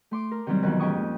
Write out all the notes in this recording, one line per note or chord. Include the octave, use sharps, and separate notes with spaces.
A3 C6 D6
A#4
C3 D#3 F#3 G3 C4
F2 B2 D#3 E3 F#3
G#2 C#4 G5 C#6 D#6
A#2